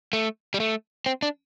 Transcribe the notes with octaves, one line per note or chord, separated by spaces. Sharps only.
A3
G3
A3
C4
D4